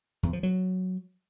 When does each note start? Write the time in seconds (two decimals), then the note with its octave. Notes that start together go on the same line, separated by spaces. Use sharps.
0.23 E2
0.33 F3
0.43 F#3